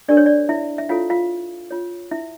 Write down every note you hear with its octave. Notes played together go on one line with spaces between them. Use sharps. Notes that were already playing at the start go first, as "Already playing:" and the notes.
D4 G4 A#4 D5
C#5
D5
E4 E5
E5
E4 F4 A4 C#5 F5
F4 F5
F4 C#5
E4 E5